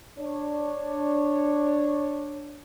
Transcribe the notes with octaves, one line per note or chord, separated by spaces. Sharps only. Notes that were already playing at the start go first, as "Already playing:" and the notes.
D4 C#5